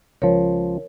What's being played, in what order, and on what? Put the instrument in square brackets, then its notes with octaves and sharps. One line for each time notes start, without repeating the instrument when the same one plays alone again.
[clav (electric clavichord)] C#2 F3 [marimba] A#4 C#5